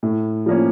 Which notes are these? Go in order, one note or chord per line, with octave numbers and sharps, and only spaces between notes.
A2
F3 A#3 C#4